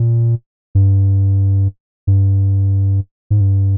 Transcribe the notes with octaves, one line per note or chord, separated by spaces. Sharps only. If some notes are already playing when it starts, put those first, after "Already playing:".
Already playing: A#2
G2
G2
G#2
G2